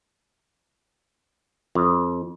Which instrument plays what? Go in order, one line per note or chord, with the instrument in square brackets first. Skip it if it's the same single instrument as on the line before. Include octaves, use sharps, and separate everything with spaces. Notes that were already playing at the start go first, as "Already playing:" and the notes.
[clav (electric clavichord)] F2